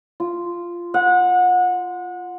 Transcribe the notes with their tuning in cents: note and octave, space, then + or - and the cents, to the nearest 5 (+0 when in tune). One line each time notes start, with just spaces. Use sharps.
F4 -10
F#5 -30